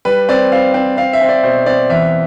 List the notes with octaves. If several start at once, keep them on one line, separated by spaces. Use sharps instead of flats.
G3 B4
C4 D5
C4 F5
C4
C4 F5
E5
C4
D5
B2 C5
C4 D5
E2 E5